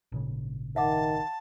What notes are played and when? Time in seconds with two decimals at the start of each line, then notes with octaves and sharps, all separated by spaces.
0.12 G#1 A#2 C#3
0.76 D#3 E5 F#5 A5 D6